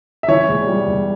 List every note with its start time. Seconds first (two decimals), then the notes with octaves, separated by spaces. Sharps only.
0.23 E5
0.28 E3 C#5
0.48 E1
0.67 G3
0.87 E1